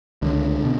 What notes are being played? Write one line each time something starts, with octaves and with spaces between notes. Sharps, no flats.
C#2 D3
B2